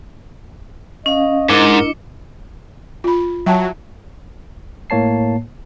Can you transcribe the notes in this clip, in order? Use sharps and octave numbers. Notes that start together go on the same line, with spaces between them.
C#4 D#5 F5
G#2 D4 E4 A#4 D#5 D6 C#7 G7
F4 B5
F#3 E5 G5 A5
A2 A#3 C#5 A5 C7